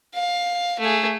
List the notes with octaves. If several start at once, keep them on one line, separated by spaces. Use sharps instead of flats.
F5
A3 G#4